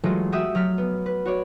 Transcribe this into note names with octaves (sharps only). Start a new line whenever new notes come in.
E3 F#3 G#3 A3 F4
F#4 G4 E5 D#6 E6
F#3 F6 B6
B3
B4
F#4 C#5 D5